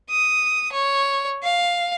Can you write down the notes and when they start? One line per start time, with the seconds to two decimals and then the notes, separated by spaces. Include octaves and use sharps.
0.10 D#6
0.72 C#5
1.43 F5